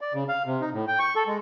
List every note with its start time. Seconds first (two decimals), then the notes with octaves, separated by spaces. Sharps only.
0.01 D5
0.14 C#3
0.28 F5
0.46 C3
0.61 D#4
0.73 A2
0.88 G5
0.99 C#6
1.16 A4
1.27 G#3